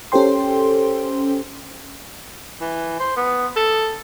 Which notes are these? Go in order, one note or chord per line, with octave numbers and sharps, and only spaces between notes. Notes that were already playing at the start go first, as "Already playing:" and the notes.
C#4 G4 A4 C5 G5 C6
E3
C5
B3
A4